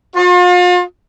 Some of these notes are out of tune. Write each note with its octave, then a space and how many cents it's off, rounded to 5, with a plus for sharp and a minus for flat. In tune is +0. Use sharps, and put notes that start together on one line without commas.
F4 +40